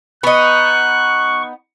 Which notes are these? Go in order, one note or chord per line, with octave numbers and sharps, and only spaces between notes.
B3 D#4 C#6 F#6